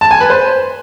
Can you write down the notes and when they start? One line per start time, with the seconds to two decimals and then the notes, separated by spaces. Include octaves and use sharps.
0.01 A5
0.11 G#5
0.20 B4
0.30 C5